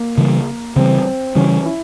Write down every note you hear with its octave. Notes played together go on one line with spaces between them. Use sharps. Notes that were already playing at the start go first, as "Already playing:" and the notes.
Already playing: A#3
C#3 E3 G3
C#3 E3 G3 C4
C#3 E3 G3 C#4
E4